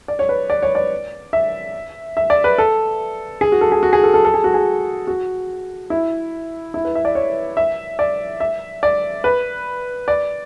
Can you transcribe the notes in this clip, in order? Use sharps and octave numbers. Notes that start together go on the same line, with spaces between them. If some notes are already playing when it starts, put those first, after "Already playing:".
D5
C#5
B4
D5
C#5
D5
E5
E5
D5
B4
A4
G#4
F#4
A4
G#4
F#4
G#4
A4
A4
A4
G#4
F#4
G#4
F#4
E4
E4
B4
E5
D5
C#5
E5
D5
E5
D5
B4
D5